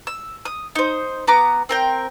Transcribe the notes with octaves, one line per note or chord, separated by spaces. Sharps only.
E6
D#6
D#4 C5
B3 A#5 D6
C4 A#4 G5